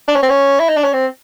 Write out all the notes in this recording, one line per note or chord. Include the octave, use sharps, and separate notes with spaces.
D4
C#4
C4
C#4
E4
D#4
D4
C#4
C4